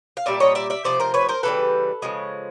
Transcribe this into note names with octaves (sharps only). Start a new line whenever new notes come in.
F5
A#2 G3 D5 E5
C#5 D#5
D5 E5
D5 E5
C3 F3 A3 C5 D5
A#4 C5
B4 C#5
A#4 C5
C#3 E3 G3 A4 B4
C#3 F3 G#3